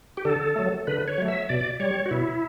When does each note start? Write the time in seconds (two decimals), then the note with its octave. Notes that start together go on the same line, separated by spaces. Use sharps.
0.17 G4
0.25 D3 A4
0.56 F#3 A3
0.87 D3 B4
1.08 C#5
1.18 F#3 A3
1.28 E5
1.49 B2 D5
1.80 G3 C#5
2.06 F#4
2.11 B2 E4